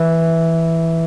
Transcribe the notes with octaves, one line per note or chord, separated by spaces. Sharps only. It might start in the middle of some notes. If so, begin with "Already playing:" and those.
Already playing: E3